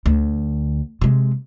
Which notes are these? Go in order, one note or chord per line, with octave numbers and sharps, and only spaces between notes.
D2
C3 G#3